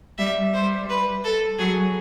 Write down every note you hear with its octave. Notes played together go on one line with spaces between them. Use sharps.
G3 E5
G3 C5
B4
A4
F#3 G#4